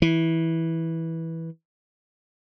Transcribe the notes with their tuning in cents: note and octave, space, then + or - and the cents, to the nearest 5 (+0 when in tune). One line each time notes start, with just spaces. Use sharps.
E3 -10